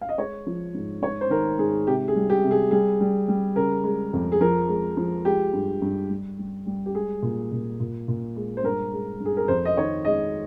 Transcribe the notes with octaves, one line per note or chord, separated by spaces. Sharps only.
F5
D#5
G#3 C#5
F3
G#2
G#2 C#5
C5
D#3 A#4
G#2 G#4
C3 G4
G#4
G3
G4
C3
G#4
G3 G#4
G3
G3
C#3 A#4
G#3
F2
G#4
F3 A#4
G#3
F3
G#3 G4
G2
G2
G3
G3
G3
G4
G#3 G#4
A#2
A#2
A#2
A#2
G#3
C5
G2 A#4
G#3
G2
G#4
A#4
F2 C5
D#5
D#3 C#5
G#3 D#5